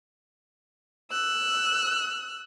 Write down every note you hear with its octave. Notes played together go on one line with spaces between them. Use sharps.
E6 F#6